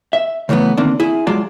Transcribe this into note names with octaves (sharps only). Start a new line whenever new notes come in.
E5
C#3 E3 F#3 A3 B3
D3 D#3 A#3 C4 D4
E4 G#4
F#3 G#3 F4 D5 A5